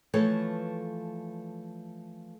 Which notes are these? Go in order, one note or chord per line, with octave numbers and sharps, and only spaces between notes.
E3 F3 A3 A4 B4 C#5